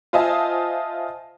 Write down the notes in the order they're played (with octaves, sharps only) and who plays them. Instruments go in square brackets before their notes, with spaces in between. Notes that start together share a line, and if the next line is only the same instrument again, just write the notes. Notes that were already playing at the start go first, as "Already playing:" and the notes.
[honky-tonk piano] F4 C5 D#5 E5 G#5 A5